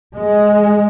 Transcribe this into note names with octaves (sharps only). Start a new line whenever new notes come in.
G#3